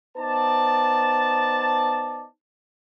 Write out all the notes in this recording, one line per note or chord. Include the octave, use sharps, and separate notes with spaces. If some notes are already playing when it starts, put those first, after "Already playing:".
B3 D#4 C5 D5 A5